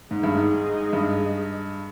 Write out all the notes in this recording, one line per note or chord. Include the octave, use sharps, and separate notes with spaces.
G#2 G#3 D#4 G#4 D#5
G2
G#2
G2